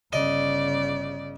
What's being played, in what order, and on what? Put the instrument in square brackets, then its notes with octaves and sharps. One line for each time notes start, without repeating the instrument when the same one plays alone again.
[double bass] G1 C#3 [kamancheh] D5 [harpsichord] D#5